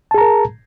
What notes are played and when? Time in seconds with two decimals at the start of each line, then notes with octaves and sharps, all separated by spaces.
0.11 A5
0.14 G#4
0.18 A#5
0.21 A#4